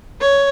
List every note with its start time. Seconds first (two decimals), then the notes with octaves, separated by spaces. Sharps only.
0.21 C#5